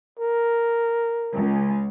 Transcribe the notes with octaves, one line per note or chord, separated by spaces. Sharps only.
A#4
C#2